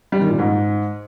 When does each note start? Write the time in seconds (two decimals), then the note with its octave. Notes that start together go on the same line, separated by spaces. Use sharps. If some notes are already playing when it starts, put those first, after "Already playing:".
0.12 G3
0.21 D#3
0.30 A#2
0.39 G#2